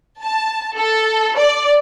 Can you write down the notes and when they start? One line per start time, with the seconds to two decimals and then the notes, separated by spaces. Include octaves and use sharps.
0.22 A5
0.77 A4
1.38 D5